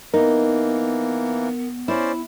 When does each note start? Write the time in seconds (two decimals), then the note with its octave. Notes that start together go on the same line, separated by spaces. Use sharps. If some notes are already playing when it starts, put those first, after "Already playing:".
0.14 E3 A#3 B3 D#4 A#4
1.88 C#4 E4 C5 D5